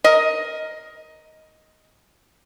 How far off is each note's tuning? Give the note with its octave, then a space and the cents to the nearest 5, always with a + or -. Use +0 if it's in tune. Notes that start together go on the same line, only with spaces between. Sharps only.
A#4 +0 D#5 +10